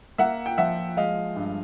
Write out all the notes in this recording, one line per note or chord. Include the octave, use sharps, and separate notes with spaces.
A#3 E5 F#5
G5
F3 E5 F#5
G#3 D#5 F5
G2